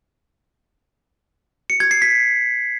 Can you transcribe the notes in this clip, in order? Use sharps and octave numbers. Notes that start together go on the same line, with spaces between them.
C#7
G#6
C7
B6